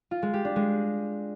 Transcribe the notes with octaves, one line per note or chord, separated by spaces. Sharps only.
F4
G#3
G4
D4
G#3